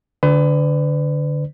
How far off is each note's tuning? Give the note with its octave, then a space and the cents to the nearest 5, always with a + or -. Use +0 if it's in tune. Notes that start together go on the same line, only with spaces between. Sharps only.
D3 +0 B4 +35 D5 +0